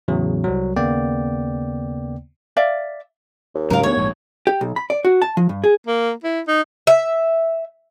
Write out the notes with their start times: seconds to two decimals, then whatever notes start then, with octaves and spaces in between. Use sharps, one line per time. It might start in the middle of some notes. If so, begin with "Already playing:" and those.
0.08 E2 A2 C#3 F#3
0.44 C2 F#3
0.76 D#2 C#3 A#3 B3 D5 G5
2.57 D5 E5 F5
3.55 D#2
3.70 G#2 C#3 F#3 A#4 F5
3.83 D2 G3 B3 C#5
3.96 A#1 G#2
4.47 G4
4.61 B1
4.76 B5
4.90 D5
5.05 F#4
5.22 A5
5.37 F3
5.49 G2
5.64 G#4
5.87 A#3
6.24 E4
6.48 D#4
6.87 E5